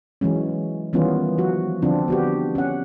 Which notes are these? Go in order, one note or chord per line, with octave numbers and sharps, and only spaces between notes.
E3 F#3 G#3 C#4
D#3 E3 G3 B3 C#4 F4
F3 F#4
D3 F3 C4 D4 F4
B3 F#4 G4
C#4 F#5